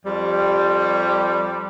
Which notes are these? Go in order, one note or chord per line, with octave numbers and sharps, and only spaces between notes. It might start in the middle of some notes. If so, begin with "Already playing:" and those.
F2 G3